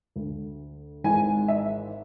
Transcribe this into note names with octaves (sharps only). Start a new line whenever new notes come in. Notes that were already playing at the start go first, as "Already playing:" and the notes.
D2 D3
G#1 G#2 E3 G#5
E5